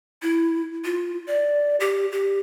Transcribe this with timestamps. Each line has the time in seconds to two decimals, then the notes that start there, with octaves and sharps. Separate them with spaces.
0.22 E4
0.84 F4
1.27 D5
1.80 G4
2.12 G4